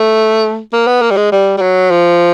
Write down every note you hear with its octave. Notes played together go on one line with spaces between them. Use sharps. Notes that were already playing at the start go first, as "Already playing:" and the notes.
Already playing: A3
A#3
B3
A#3
G3
G#3
G3
G3
F#3
F3